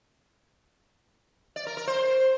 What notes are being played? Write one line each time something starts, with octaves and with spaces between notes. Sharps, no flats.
D5
A#4
A#4
C5